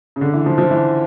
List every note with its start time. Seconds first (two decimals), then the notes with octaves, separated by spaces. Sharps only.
0.16 C#3
0.21 D3
0.33 E3
0.46 F3
0.58 F3
0.71 E3